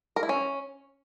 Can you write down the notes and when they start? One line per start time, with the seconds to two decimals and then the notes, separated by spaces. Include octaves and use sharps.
0.16 A#4
0.23 E4
0.29 C#4